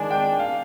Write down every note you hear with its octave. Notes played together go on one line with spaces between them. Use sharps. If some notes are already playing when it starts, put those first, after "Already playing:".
Already playing: D#3 G#3 D4 G#5
G5
F5